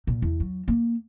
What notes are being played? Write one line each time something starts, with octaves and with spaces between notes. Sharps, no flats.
A#2
E2
F#3
A#3